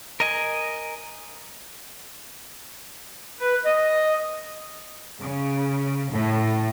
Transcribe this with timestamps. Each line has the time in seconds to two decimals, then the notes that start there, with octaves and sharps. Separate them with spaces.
0.20 A#4 D#5 G#5
3.40 B4
3.65 D#5
5.20 C#3
6.12 A2